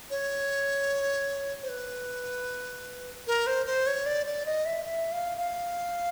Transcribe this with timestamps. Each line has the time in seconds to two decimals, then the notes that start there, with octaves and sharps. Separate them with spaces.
0.10 C#5
1.63 C5
1.69 B4
3.27 A#4
3.47 C5
3.66 C5
3.87 C#5
4.06 D5
4.26 D5
4.46 D#5
4.66 E5
4.85 E5
5.12 F5
5.38 F5